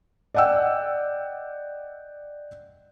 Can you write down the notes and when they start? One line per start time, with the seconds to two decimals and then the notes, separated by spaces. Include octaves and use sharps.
0.34 D5 D#5 F#5 G5 E6